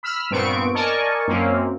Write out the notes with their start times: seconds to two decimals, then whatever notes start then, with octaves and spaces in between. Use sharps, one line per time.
0.03 B5 E6 F6
0.31 G2 A#2 B3 C4 C#6 D7
0.74 A#4 D5 D#5 G#5 A5 C#6
1.28 F#2 A#3 C4 C#4